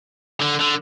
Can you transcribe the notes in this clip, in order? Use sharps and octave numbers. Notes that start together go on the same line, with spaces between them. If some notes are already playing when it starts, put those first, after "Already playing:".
D3
D3